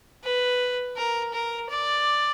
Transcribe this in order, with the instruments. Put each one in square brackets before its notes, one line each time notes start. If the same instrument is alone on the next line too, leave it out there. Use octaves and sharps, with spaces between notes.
[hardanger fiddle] B4
A#4
A#4
D5